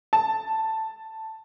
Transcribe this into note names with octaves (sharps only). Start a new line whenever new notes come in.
A5